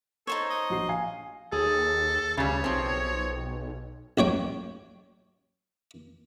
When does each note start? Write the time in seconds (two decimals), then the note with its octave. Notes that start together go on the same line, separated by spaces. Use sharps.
0.27 D#4 A4 C5 C#5
0.49 D#5
0.70 A#1 F#4 C7
0.89 F5 G#5 C7
1.52 D#2 G#4 A4
2.37 D2 C#3 G3 C#5
2.64 B1 F3 C4
4.18 A1 F#3 C#5 G5